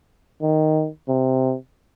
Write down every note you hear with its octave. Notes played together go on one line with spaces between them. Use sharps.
D#3
C3